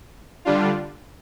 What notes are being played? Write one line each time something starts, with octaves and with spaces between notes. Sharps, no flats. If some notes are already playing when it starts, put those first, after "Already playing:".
D3 G3 D4 F4